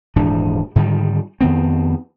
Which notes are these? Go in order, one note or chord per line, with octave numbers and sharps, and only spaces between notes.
D#1 G#2 E3 D4
G#2 D3 D#3 G3
F2 D#3 B3 C4